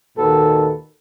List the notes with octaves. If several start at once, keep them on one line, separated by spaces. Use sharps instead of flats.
D#2 A#2 D#3 F#4 A4 B4